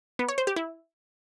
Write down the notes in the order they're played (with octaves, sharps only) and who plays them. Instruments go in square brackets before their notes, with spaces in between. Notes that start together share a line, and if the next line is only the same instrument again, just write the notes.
[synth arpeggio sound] B3
C#5
C5
G4
E4